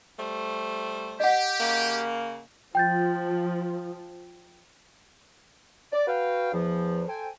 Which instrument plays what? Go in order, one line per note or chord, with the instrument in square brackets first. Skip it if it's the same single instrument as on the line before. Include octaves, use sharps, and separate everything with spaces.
[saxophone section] G3 A3 C5
[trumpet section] G4 [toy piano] D#5 F#5
[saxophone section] C#3 A#3
[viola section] F3 [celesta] G5 G6 A6
[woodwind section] D5
F#4 B4 F5 G5
E2 F3
A4 C5 G5 G#5